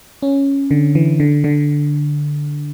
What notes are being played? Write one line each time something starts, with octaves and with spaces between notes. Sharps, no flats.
C#4
D3
E3
D3
D3